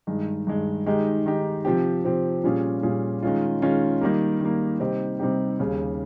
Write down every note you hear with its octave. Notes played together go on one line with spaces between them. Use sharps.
G2 D#3 G#3
G2 D#3 G#3
D#3 G#3 D#4 G4
D#3 G#3 D#4 G4
C3 F3 C4 G4
C3 F3 C4 G4
A#2 G3 C#4 F4 G#4
A#2 G3 C#4 F4 G#4
D#3 G#3 C#4 F4
D#3 G#3 C#4 F4
D#3 G3 A#3
D#3 G3 A#3
C3 G3 C4 D#4 G4
C3 G3 C4 D#4 G4
D#2 C#3 G3